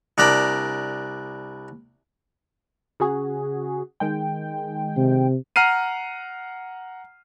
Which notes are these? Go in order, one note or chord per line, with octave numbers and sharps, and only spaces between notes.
C2 D4 A#4 B5
C#3 F#4 G#4
D#3 G#3 G5
C3
F#5 A#5 F6 C7 D#7